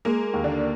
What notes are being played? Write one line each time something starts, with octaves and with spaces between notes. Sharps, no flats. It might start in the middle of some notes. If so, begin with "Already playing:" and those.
G#3 A#3
D#2
D3 D4